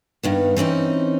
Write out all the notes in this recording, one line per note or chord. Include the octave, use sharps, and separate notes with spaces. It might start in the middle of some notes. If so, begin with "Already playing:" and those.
G2 D#3 B3
E3 C4 C#4 D#4